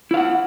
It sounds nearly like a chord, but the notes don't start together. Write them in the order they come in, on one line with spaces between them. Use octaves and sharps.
E4 F5 F#5